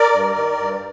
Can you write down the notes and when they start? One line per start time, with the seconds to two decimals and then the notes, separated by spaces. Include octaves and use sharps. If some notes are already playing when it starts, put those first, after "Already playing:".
Already playing: A#4 D5
0.14 G2
0.36 D#3
0.58 G2